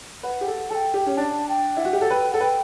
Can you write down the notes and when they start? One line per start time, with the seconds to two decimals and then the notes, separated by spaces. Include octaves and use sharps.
0.23 B4 F#5
0.41 G4
0.47 A4
0.70 A4 G5 A5
0.94 G4
1.06 C#4
1.17 D4 A5
1.49 G5
1.77 E4 F#5
1.85 F#4
1.93 G4
2.01 A4
2.10 B4 G5
2.31 A4 F#5
2.41 B4 G5